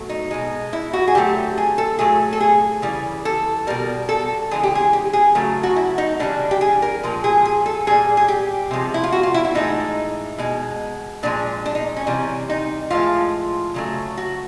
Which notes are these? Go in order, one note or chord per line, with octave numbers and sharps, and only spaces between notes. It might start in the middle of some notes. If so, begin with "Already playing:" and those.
Already playing: B2 F#3 A3
D#4
B2 G#3
E4
F#4
G#4
D3 F#3 A3 G4
G#4
A4
A2 F#3 A3 G#4
A4
G#4
C#3 E3 G3
A4
B2 G3 A#4
A4
C#3 E3 G#3 G#4
G4
G#4
G4
G#4
C#3 F#3 A3
F#4
E4
D#4
C#3 E3 G3 D4
G4
G#4
A#4
A#2 F3 G#3
G#4
G#4
A4
A#2 G3 G#4
G#4
G4
C3 F3 G#3
E4
F4
F#4
F4
E4
E4
A2 E3 G#3 D#4
B2 G#3
A#2 F3 G#3 D4
D4
D#4
C#4
C3 E3 G3
D#4
A2 F3 G#3 F4
C#3 F#3 A3
F#4